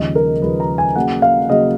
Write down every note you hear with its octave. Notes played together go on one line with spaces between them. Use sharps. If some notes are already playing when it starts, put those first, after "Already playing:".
Already playing: D#2 C#3 F3 G#3 D#5
A#4
D#2 C#3 F3 G#3 B4
A#5
G#5
C#3 F#3 A#3 F#5
F5
C#3 F#3 A#3 D#5